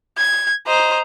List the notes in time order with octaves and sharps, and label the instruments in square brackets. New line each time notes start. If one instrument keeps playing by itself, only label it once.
[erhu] G#6
[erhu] C5 [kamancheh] D#5 A#5